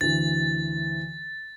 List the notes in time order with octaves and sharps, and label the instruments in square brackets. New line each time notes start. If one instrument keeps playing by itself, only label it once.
[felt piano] D2 E3 [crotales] A6